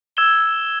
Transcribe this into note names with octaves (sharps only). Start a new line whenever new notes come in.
E6 G#6 E7 G7